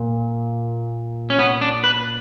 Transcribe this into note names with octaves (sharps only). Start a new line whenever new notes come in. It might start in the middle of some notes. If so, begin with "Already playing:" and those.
Already playing: A#2
C#4
B3
D4
B4